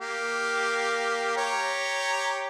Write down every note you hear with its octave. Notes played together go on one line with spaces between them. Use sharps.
A#3 G4
G4 C#5 A#5